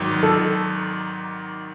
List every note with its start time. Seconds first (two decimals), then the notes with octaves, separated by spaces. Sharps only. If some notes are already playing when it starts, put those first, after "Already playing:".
Already playing: G#1 G#2 D#3 F#3
0.23 A4